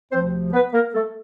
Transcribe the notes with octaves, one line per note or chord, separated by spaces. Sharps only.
D2 C3 F3 C4 C5
B3 B4
A#3 A#4
A3 A4